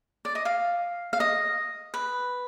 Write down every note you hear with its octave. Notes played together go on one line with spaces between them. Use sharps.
D5
D#5
F5
F5
D#5
B4